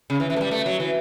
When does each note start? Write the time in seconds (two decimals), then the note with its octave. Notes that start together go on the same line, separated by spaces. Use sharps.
0.10 C#3
0.20 E3
0.30 E3
0.36 A3
0.41 G3
0.51 A3
0.66 F#3
0.80 E3